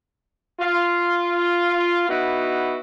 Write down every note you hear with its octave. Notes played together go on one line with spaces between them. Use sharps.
F4
B3 D#4 E4 F#4